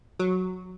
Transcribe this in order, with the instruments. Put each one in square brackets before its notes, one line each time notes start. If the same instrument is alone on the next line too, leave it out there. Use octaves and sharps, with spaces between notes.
[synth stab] F#3